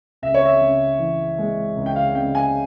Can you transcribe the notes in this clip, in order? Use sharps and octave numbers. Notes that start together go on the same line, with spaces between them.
C#2 E5
C#5
E5
C#3
E3
G#3
C#2
G5
F5
C#3 G5
G#5